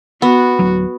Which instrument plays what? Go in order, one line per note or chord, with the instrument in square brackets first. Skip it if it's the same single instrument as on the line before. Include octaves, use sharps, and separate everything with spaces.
[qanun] B3 [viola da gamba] F#4
[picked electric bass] D1 F#3